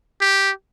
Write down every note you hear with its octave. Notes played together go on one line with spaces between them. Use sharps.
G4